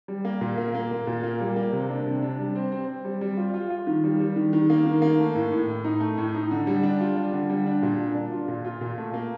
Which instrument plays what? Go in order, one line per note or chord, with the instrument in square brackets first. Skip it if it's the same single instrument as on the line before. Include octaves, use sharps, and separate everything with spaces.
[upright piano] G3
A#3
A#2
A#3
A#3
A#2
A#2
A#3
G3
A#3
C3
D4
C3
D4
G3
C4
C4
C4
G3
G3
F4
F4
F4
D#3
G3
G3
D#3
D#3
A#3
D#3
A#3
A3
A2
A2
A2
D#4
A3
A2
D#4
D3
G3
D4
F4
G3
D3
G3
D4
A#2
D4
D4
F4
A#2
F4
A#2
A3
A#3